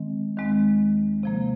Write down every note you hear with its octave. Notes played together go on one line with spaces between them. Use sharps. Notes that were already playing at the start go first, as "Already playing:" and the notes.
Already playing: D#3 G#3 C4
D#2 D#3 G#3 C4
C3 F3 A#3